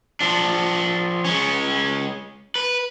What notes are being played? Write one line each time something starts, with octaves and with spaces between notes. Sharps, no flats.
F3 D4
G#3 C#4
B4